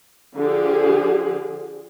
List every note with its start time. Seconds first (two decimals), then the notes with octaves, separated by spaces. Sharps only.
0.36 D3 F3 G4 G#4